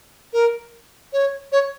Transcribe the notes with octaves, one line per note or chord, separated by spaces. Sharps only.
A#4
C#5
C#5